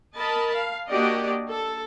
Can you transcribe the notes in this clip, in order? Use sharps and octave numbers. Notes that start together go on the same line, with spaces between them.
A#4 D#5 A5 B5
F5
A#3 D4 F#4 G4 D5 D#5
A4